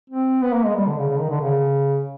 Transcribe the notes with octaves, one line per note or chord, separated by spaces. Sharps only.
C4
B3
A#3
G#3
G3
D3
C#3
C#3
D#3
D3
C#3